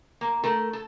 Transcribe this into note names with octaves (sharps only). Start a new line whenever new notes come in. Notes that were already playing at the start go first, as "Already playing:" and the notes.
A#3
A3 A4 A#4
A4